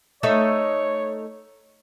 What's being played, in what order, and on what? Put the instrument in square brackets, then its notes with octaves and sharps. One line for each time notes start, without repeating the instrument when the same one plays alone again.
[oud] A3 D#4 E5 [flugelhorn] C#5